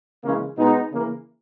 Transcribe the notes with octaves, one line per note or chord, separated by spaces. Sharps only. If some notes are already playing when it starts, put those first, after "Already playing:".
C#3 E3 G#3 A#3 C#4
B2 G#3 B3 D#4
C#3 E3 A#3